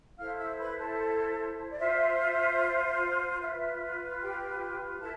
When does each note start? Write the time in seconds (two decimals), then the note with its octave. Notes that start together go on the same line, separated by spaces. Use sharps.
0.17 E4 A4 C5 F5 F6
0.38 E5 E6
0.58 B4 B5
0.78 A4 A5
1.71 D5
1.79 F4 C5 E5
3.40 F4 B4 E5
4.20 G4 G5
5.01 E4 A4 A5